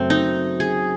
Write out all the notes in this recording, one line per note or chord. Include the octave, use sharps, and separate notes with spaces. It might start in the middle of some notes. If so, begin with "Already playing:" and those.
Already playing: F#2 C#3 F#3 A3 C4
D#4
G#4